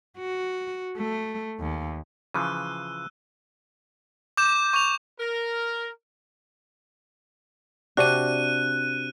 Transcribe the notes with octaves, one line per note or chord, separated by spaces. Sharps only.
F#4
A3
D#2
C#3 E3 F3 E6 F#6 D#7
D6 G6 E7
C#6 G6 F7
A#4
C3 D4 F#4 F#6 D#7